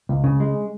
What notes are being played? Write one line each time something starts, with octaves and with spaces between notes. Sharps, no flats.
C#2
C#3
G#3